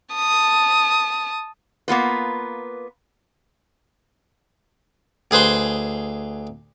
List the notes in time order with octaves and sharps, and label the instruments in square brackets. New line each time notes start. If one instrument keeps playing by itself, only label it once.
[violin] A5 D#6
[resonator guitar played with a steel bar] A#3 B3 F4 B4
[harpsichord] D2 G#4 B4 C5 C6